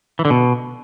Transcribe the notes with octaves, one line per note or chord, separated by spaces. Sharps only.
E3
D3
B2